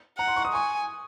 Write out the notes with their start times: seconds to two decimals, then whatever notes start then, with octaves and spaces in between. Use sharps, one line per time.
0.18 F#5 A#5
0.28 C6
0.36 C#6
0.45 D#6
0.54 G#5 C#6